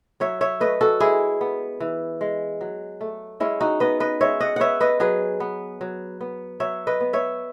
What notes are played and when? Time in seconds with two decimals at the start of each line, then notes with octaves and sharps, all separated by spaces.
0.20 F#3 C#5 E5
0.41 C#5 E5
0.60 A3 B4 D#5
0.81 F#4 A4
1.00 G#3 E4 G#4
1.41 B3
1.80 E3
2.21 G#3
2.61 F#3
3.01 A3
3.40 G#3 C#4 E4
3.60 D#4 F#4
3.80 B3 B4 D#5
4.00 B4 D#5
4.20 G#3 C#5 E5
4.40 D#5 F#5
4.56 B3 C#5 E5 F#5
4.81 B4 D#5
5.00 F#3 G#4 B4
5.40 B3
5.81 F#3
6.21 B3
6.60 F#3 C#5 E5
6.87 B4 D#5
7.00 B3
7.13 C#5 E5